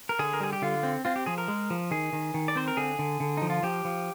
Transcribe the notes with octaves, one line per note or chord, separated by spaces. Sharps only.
A#4
D3 G#4
A#4
G3 G#4
G4
D3 F4
C4
C4 F4
G4
F3 G#4
A#4
G#3
F3
D#3 G#4
D#3
D#3
D5
C4 C5
A#4
D3 G#4
D3
D3
F3 D#4
F4
F3 G4
F3